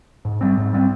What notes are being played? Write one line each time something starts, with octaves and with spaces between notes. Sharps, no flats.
G#2
G3 C4
G#2
G3 C4